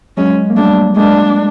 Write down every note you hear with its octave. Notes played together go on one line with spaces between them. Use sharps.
F#3 G#3 C#4
A#3
G3 A3 D4
G#3 A#3 D4